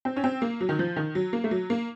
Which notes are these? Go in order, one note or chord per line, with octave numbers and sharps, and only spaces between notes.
C4
C#4
C4
A#3
F#3
D#3
F3
D#3
F#3
A#3
A3
F#3
A#3